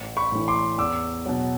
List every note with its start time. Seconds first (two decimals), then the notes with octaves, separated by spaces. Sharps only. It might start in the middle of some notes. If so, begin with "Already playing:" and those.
Already playing: A1
0.17 B5 C#6
0.32 A2 E3
0.48 C6 D6
0.78 E2 D6 E6
1.26 B2 F#3